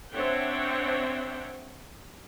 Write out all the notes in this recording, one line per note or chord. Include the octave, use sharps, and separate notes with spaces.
C4 D4 C#5 E5 F#5 G5